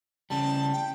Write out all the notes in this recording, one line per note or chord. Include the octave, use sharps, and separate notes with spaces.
C#3 G3 A5
G5